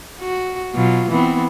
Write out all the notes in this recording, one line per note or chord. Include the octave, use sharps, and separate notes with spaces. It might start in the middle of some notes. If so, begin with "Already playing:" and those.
F#4
B2 F#3 F4
E3 B3 C4